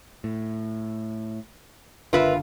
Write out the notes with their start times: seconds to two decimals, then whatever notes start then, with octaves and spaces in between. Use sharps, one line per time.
0.24 A2
2.13 F#1 D3 F4 A#4 B4 E5